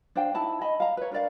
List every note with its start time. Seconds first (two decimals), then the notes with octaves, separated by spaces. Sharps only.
0.15 D4 C5 F5 G5
0.34 D#4 E4 A5 B5
0.61 D#5 G#5 B5
0.80 F5 A#5
0.97 B4 C#5
1.11 D4 A#4 D5 F5